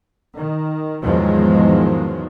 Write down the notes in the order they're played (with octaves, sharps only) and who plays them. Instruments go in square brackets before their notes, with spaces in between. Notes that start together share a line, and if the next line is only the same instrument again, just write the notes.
[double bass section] D#3
E2 G#2 D#3 F3 F#3 G#3